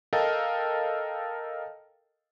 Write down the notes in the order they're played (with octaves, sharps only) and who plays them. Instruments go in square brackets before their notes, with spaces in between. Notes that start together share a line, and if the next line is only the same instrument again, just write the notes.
[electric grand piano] A4 A#4 D#5 F5 G5 A5